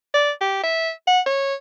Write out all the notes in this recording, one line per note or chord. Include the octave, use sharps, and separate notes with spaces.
D5
G4
E5
F#5
C#5